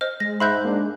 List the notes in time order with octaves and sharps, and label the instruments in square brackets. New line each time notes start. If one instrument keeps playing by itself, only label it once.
[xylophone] C5 D#5 F6
[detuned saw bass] G#3 [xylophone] A#6
[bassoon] G#2 [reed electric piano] E5 C6 [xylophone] B5 F#6 G6
[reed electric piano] A#3 D4